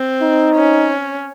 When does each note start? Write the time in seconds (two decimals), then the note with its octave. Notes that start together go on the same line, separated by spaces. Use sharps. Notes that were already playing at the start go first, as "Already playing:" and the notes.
Already playing: C4
0.22 D#4
0.56 C#4